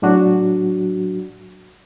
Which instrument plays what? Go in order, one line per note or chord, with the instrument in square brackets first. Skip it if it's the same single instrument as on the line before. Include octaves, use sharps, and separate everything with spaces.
[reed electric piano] A2 F#3 D4 F#4